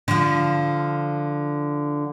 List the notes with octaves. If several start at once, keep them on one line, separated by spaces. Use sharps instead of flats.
D3 F3